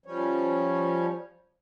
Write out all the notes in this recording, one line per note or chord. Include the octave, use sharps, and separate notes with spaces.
F3 G3 C#4 C#5